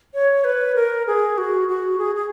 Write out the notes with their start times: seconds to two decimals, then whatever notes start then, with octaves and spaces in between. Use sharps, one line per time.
0.14 C#5
0.44 B4
0.75 A#4
1.07 G#4
1.38 F#4
1.69 F#4
1.98 G#4
2.15 G#4